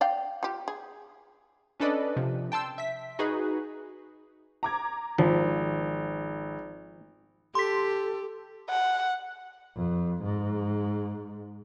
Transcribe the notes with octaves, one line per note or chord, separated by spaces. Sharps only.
D5 F5 G5
F4 G4
G#4
C#4 D4 A4 B4 D5 D#5
C3 F3
G5 A5 C6 E6
E5 B6
D#4 F#4 G#4 B4
A#5 D6 G#6
G#1 F3
G4 A4 C6 B6
F#5
F2
G#2